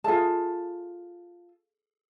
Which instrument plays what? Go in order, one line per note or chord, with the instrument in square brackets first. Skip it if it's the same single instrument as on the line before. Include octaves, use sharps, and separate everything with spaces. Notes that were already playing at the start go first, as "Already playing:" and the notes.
[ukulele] F4 A5 [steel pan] G#4 A4 E5